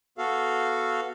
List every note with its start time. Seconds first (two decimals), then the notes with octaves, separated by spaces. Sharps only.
0.18 B3 F#4 A4 F5